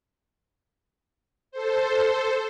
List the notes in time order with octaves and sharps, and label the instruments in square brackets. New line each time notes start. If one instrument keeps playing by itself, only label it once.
[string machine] A4 C5